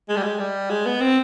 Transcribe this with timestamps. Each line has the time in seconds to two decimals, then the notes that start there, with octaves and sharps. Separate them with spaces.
0.09 G#3
0.17 G3
0.23 G#3
0.40 G3
0.70 G#3
0.86 B3
1.01 C4